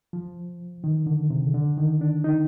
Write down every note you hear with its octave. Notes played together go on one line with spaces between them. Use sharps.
F3
D#3
D3
C3
D3
D#3
D4
D#4